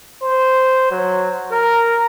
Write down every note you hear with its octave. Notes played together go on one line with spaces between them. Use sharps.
C5
F#3
A#4